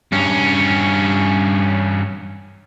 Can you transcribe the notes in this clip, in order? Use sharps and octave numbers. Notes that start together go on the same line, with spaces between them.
G2 C#4